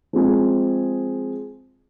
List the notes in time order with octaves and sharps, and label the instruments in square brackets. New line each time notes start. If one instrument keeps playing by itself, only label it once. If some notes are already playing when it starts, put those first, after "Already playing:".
[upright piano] F3 G#3 C4 G#4